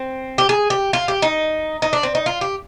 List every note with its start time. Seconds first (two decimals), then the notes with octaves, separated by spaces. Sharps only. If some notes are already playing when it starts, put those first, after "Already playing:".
Already playing: C4
0.38 G4
0.49 G#4
0.70 G4
0.93 F4
1.08 G4
1.22 D#4
1.82 D#4
1.93 D4
2.03 C4
2.15 D#4
2.26 F4
2.41 G4